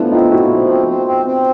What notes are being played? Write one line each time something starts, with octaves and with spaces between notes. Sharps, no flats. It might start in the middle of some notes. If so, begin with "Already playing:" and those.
Already playing: F3 A3 B3 D4 E4
C4 D#4 F4
A#2 E4 F#4
F3
C4
C4
C4
C4